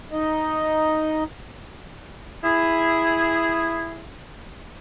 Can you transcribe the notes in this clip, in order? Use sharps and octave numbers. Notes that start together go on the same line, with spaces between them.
D#4 D#5
E4 G#4